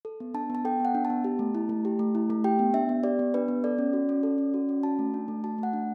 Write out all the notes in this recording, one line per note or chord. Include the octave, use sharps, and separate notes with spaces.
A4
B3
D4 A5
B3 A5
A4 G5
B3 F#5
D4
A5
B3
G4
A3
E4
A3
G4
A3
E4
A3
G4 G5
B3
D4 E5
B3
G4 D5
B3
D4 B4
B3
A4 D5
C#4
F#4
C#4
A4
C#4
F#4
C#4
F#4 A5
A3
D4
A3
F#4 A5
A3 F#5
D4